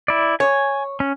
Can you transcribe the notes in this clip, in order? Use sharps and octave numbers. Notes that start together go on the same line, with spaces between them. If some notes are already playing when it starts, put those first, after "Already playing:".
E4 D5
C#5 G#5
C#4